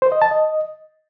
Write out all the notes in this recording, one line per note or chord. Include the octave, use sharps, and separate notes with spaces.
C5
D#5
A5
D#5